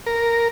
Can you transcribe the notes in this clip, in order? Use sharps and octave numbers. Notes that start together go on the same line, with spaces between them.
A#4